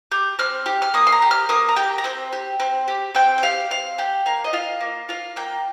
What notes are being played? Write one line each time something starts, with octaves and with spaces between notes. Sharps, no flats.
G4 G6
C4 F6
G4
F6
A#3 D#6
C6
A#5
G4
F6
A#3 D#6
A#5
G4 G5
A#5
C4 G5
G4
C4
G4
C4 G5
G5
G4 F5
C4 F5
G4 G5
A#3 F5
D#5
F4 F5
A#3
F4 F5
A#3 G5